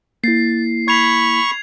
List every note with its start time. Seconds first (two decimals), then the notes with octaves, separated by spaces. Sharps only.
0.24 A#3 E4 A6 C7
0.88 B5 C#6 G#6 F7